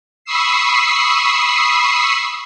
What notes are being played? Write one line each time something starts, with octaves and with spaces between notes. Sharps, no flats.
B5 C#6 D#6 E6 C7